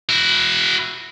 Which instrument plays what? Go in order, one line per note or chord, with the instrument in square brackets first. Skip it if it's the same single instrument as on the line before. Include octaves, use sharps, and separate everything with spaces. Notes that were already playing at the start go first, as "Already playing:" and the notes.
[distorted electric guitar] E4 F#4